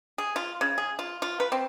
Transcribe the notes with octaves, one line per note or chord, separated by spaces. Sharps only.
G#4
F4
C#3
G#4
F4
F4
B4
C4